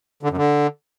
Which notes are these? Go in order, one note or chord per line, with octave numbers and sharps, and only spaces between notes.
D3
F#2
D3